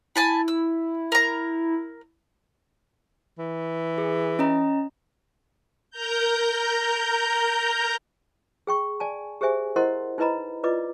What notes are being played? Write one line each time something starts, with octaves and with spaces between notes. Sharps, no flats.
E4 G#5 A5 B5
E6
A#4 A#5
E3
G#4
C#4 D#5 A#5
A#4 A#5 G6
G#4 G5 C#6
D5 G#5 A5
G4 G#4 C5 E5 G#5
E4 A#4 C5 D#5 F#5 C6
D#4 E4 B4 D#5 A#5 B5
F4 B4 D5 D#5 D6